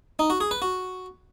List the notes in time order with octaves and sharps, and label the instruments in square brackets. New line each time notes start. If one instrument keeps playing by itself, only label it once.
[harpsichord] D#4
F#4
G#4
B4
F#4